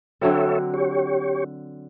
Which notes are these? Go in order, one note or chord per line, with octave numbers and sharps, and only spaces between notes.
D3 F#3 C4 A4 C#5 E5
G4 C#5